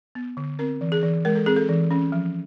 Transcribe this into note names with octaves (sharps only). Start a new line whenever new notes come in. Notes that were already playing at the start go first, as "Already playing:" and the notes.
B3
D3
C4 A#4
E3
G#4
E3
G#3 A#4
A4
C4 G#4
A4
E3
C#4
F3